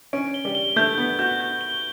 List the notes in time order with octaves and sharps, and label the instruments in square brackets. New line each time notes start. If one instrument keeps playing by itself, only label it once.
[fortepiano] C#4 [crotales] D7
[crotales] G7
[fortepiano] G3
[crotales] G7
[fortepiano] A3 [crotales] G6
[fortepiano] B3 [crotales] G7
[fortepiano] F#4 [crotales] G6
[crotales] G6
G7